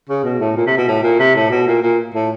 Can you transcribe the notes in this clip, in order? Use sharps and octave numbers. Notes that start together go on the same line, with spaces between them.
C#3
B2
A2
A#2
C3
B2
A2
A#2
C3
A2
B2
A#2
A#2
A2